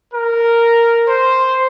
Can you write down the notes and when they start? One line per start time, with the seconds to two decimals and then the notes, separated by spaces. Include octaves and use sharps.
0.14 A#4
1.08 C5